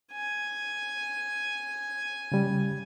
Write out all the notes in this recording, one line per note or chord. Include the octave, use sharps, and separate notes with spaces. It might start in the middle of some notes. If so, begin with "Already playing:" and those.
G#5
C#3 G3